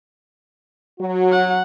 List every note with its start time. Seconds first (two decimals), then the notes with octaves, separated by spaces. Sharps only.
0.99 F#3 F#4
1.32 F#5